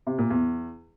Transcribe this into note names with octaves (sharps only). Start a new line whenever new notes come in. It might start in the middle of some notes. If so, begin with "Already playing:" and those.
C3
A#2
E2